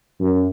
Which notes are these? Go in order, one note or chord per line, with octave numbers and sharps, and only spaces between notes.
F#2